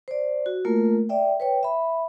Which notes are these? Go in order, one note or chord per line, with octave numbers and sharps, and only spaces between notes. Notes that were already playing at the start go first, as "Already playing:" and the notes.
C5 D5
F#4
A3 A#3 F4 A#4
D5 E5 G5
B4 C#5 G5
E5 B5